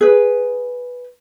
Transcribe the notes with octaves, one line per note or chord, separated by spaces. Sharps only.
G#4 B4